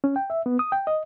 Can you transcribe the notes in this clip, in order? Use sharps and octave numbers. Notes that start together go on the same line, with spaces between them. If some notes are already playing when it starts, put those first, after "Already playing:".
C#4
G5
E5
B3
D#6
G5
D#5